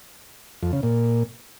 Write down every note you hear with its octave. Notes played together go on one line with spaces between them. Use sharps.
F2
C#3
A#2